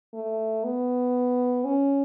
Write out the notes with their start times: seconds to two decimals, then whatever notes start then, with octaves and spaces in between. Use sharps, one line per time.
0.14 A3
0.64 B3
1.65 C#4